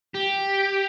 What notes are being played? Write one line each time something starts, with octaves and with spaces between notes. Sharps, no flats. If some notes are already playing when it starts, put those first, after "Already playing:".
G4